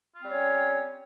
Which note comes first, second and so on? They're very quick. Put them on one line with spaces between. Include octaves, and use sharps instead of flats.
F4 C4 G3 C#5 C#4